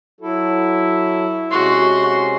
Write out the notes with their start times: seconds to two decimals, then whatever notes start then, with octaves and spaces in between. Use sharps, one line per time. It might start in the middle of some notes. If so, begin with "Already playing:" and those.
0.21 F#3 E4 F#4 A4
1.51 C3 G#3 C#4 F#4 C6